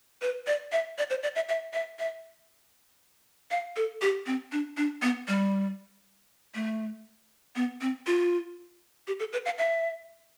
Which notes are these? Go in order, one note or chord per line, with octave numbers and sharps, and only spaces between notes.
B4
D5
E5
D5
C5
D5
E5
E5
E5
E5
F5
A4
G4
C4
D4
D4
B3
G3
A3
B3
C4
F4
G4
A4
B4
F5
E5